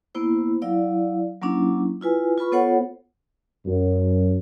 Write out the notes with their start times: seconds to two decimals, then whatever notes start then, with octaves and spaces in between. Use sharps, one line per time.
0.15 A#3 B3 E4 C5
0.62 F#3 E4 D5 F5
1.42 F#3 A#3 C#4 D4 E4
2.01 E4 F4 B4 G#5
2.38 F4 B4 B5 C#6
2.52 B3 F4 A4 C5 C#5 F#5
3.66 F#2